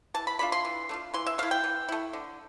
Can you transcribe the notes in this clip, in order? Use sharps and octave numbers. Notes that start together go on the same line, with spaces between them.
E3 A5
B5
A3 D4 F4 B5
C6
E3
A3 D4 F4
E3 C6
E5
A3 E4 F5
G5
E3
A3 E4
D3